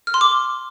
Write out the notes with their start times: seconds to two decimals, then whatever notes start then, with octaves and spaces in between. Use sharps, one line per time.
0.07 F6
0.14 C6
0.21 D6